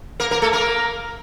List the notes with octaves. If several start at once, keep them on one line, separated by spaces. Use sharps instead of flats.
A#3 A#4
A#3 A#4
A3 A4
A#3 A#4